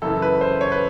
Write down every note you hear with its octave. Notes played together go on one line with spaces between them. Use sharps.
F#2 C#3 E3 A4
B4
C5
C#5
B4